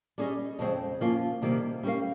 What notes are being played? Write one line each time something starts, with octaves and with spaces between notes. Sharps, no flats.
G3 C#4 G#4 D#5
F2 C#3 G#3 C4
F3 A#3 C#4 F4
C3 D#3 G3 A#3
G3 C#4 F4 A#4 F5